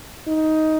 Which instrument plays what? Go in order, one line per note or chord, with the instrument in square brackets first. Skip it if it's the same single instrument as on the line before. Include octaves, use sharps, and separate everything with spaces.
[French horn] D#4